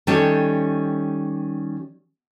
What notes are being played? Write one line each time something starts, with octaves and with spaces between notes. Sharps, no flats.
D#3 G3 C#4 G4 A4 C#5